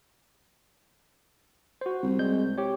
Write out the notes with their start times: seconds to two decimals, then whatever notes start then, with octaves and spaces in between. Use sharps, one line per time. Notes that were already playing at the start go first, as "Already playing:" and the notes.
1.81 F#4 C5
2.03 C2
2.19 G3 G#3 G6
2.58 G4 C#5